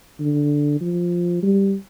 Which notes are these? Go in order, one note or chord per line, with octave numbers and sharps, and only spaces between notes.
D3
F3
G3